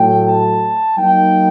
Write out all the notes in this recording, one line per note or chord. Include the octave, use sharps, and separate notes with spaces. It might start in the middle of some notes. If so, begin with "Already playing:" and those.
Already playing: A2 F#3 A3 G5
A5
F#3 A#3 D#4 G5